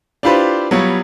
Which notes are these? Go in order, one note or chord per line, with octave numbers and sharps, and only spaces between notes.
D4 E4 F4 G4 B4 C5
F#3 G3 B3 F4 C#5